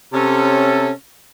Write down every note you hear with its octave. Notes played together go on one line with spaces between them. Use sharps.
C3 C#4 A4